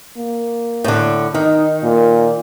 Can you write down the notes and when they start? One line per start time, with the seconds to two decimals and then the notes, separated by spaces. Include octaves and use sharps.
0.17 A#3
0.84 A2 D3
1.34 D#3 D#4
1.83 A#2